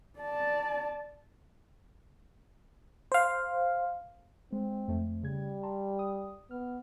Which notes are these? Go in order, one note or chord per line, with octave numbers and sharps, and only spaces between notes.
D5 A5
C5 F5
G#3 C4
F2 A3 C5
C#3 G3 G#6
A5 A#5 C6
D#6
B3 F6